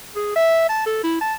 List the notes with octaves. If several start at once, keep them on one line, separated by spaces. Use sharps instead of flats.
G#4
E5
A5
A4
E4
A5